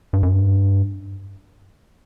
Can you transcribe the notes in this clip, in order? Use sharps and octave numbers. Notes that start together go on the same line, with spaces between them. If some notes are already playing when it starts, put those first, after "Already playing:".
G2
F#2
G2